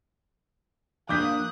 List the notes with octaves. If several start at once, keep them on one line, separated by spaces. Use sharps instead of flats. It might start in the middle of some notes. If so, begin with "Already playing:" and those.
F3 A#3 D4 D6 D#6 F#6 G6 B6